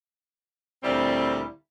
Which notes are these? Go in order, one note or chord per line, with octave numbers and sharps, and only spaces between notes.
D2 A#2 G3 C4 E4